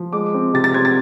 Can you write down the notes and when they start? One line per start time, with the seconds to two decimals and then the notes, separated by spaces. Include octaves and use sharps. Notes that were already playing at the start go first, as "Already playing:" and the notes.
Already playing: F3
0.13 G#3 D6
0.34 C4
0.54 C3 A6
0.64 A6
0.74 C4 G#6
0.85 A6